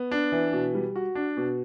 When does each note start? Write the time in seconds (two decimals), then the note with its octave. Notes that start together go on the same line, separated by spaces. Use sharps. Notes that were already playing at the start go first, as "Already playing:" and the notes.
Already playing: B3
0.12 D4
0.32 E3
0.53 B2
0.75 G3
0.96 F#4
1.15 D4
1.37 B2